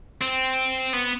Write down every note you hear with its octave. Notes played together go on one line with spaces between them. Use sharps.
C4
B3